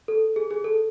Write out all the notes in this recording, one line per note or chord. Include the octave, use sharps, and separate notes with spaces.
A4
G#4
G#4
A4